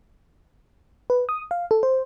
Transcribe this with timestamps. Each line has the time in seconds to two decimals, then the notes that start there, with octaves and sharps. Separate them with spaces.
1.10 B4
1.29 D#6
1.51 F5
1.71 A4
1.83 C5